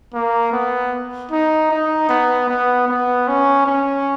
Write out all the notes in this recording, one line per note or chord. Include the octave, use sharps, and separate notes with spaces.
A#3
B3
D#4
D#4
B3
B3
B3
C#4
C#4